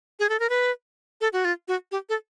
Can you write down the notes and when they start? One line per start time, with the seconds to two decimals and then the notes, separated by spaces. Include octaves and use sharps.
0.20 G#4
0.29 A4
0.40 A#4
0.50 B4
1.21 A4
1.33 F#4
1.45 F4
1.68 F#4
1.92 G4
2.09 A4